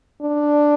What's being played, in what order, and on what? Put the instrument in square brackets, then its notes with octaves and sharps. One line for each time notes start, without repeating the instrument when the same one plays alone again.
[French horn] D4